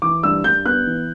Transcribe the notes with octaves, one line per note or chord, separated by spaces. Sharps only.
E3 D6
G2 E6
G2 G6
B3 F#6
E3